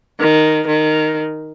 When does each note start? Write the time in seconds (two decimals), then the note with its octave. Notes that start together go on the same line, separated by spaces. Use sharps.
0.20 D#3
0.67 D#3